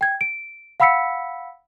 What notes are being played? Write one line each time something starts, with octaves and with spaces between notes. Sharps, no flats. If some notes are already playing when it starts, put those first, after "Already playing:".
G5 G#6
D7
F5 F#5 B5 E6 B6 C#7